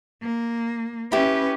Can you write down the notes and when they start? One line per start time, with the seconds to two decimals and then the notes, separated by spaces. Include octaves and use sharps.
0.22 A#3
1.12 C#4 E4 G4 B4